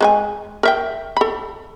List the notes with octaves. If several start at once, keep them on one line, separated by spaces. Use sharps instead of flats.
G#3 B4 G#5
A#4 E5 G5
A4 B5